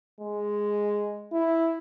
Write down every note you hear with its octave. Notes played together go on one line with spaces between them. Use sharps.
G#3
E4